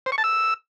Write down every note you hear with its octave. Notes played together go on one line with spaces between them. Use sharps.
C5
C#6
A5
E6